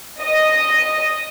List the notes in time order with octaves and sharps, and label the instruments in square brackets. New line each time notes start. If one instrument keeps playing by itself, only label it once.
[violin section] D#5